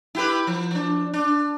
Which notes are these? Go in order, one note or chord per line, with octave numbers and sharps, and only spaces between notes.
E4 G4 B4
F3
F3 D4
D4